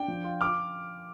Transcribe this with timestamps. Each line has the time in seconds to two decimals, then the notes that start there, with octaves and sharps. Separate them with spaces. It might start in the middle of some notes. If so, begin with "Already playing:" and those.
Already playing: D4 G5
0.08 F3
0.24 F4
0.41 D6 F6